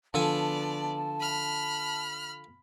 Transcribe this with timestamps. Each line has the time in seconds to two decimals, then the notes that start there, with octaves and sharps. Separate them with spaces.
0.14 D3 F3 B3 A4 D5 G#5 A5
1.19 B5 F6